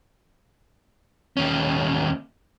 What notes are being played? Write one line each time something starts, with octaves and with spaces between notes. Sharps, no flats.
D#2 C#4